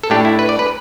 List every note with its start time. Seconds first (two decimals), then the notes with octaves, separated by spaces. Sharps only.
0.03 A4
0.10 A2 A3 D4 G4
0.25 E4
0.39 B4
0.49 D5
0.59 B4